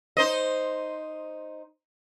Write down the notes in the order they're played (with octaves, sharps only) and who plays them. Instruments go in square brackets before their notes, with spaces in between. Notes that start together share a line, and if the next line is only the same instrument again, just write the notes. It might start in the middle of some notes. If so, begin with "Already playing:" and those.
[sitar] D#4 C5 D#5